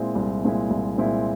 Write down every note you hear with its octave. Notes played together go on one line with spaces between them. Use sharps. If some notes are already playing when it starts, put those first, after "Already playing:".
Already playing: A#2 G#3 C4 E4
C2
A#2 G#3 C4 E4
C2
A#2 G#3 C4 E4